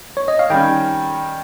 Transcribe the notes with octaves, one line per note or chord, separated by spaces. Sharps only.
C#5
D#5
F5
D#3 G3 C#4 G5